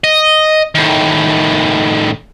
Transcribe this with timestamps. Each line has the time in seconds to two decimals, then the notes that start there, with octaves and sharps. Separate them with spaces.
0.04 D#5
0.75 A2 D#3